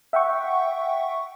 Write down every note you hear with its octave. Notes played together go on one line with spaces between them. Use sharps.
E5 F#5 G5 C#6